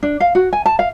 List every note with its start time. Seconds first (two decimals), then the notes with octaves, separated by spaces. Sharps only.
0.03 D4
0.20 F5
0.35 F#4
0.53 G#5
0.66 A5
0.79 F5